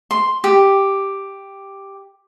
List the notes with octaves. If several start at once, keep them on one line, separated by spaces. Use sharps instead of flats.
C6
G4